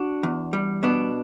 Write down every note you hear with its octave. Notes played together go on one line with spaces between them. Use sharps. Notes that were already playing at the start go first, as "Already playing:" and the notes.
Already playing: D4 F#4
E2
G3
B2 B3 D4